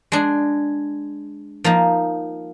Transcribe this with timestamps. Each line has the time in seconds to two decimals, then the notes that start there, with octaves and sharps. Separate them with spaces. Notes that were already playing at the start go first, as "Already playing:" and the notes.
0.12 G#3 D4 G#4
1.64 F3 A#3 D#4